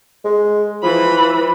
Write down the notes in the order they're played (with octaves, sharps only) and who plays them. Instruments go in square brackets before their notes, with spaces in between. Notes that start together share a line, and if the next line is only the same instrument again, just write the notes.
[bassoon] G#3
[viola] E3 B5 [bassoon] F3